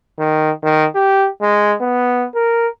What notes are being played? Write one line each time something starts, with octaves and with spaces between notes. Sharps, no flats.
D#3
D#3
G4
G#3
B3
A#4